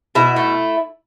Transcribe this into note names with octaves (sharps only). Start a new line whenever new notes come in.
B2 E4
A3